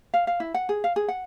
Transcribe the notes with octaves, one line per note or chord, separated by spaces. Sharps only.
F5
F5
E4
F#5
G#4
F5
G#4
F#5